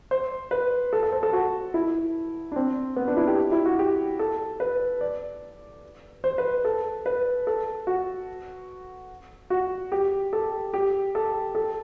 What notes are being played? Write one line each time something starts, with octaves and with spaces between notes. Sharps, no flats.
C5
B4
A4
A4
C5
A4
F#4
E4
D4
C4
B3
D4
E4
G4
E4
F#4
G4
A4
B4
D5
C5
B4
A4
B4
A4
F#4
F#4
G4
A4
G4
A4
A4